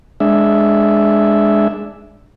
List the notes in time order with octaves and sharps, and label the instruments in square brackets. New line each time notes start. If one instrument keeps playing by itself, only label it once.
[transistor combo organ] G#3 D4 E5